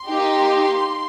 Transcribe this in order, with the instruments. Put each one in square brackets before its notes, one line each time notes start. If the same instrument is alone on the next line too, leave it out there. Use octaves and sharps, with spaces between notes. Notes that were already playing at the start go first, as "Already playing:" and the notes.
Already playing: [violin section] C6
A#3 D#4 G4